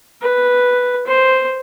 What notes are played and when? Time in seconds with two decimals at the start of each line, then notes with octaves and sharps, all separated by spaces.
0.21 B4
1.06 C5